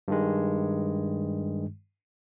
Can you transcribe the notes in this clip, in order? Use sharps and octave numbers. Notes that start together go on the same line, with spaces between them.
G2 D#3 G#3